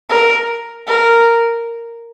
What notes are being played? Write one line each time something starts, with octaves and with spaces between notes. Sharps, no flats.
A#4
A#4